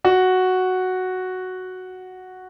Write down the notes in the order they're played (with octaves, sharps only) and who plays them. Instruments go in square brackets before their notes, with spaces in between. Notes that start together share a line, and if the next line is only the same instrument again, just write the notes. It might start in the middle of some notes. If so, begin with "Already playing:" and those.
[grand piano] F#4